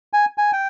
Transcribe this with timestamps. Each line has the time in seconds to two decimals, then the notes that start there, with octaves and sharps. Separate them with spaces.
0.13 G#5
0.38 G#5
0.53 G5